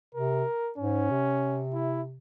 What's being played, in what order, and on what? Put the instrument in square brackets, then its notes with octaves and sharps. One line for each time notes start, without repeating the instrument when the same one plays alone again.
[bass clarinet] C3 [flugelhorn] A#4
[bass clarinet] G#2 [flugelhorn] C#4
[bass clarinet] C3
[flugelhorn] E4